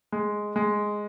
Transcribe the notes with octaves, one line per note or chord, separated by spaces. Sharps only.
G#3
G#3